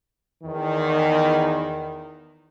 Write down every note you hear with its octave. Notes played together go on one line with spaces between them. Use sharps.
E2 D#3